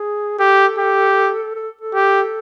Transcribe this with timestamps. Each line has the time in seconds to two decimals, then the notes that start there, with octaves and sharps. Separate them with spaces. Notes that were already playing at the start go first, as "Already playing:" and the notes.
Already playing: G#4
0.39 G4 A4
0.78 G4
1.55 A4
1.81 A4
1.94 G4